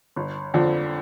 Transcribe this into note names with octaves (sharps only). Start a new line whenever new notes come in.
G1
F2 D3 F3